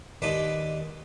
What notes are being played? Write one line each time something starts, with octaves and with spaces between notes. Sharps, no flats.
D#2 G#3 B4 D5 A5